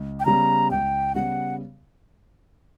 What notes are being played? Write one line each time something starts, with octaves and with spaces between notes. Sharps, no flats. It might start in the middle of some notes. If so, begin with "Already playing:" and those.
Already playing: C#2
G5
C#3 G3 B3 A#5
C#2 G5
C#3 G3 B3 F#5